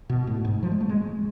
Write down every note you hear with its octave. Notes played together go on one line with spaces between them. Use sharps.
B2
A2
G#2
F3
G#3
A3
G#3